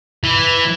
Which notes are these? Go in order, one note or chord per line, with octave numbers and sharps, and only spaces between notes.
E3